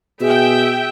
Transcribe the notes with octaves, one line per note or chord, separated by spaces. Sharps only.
B2 G#4 E5 G5